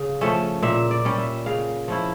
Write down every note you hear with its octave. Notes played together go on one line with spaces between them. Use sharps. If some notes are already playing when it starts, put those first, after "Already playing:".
Already playing: C#3 F5
F3 A3 C#4 E5
A#2 E5
D5
G3 C#4
E5
C#3 F5
F3 C#4 E4